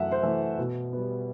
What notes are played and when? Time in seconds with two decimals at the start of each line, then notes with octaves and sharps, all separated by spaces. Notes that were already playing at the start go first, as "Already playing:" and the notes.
Already playing: F#2 E3 A3 E5 F#5
0.12 C5
0.23 E3 A3
0.58 B2
0.92 G3 B3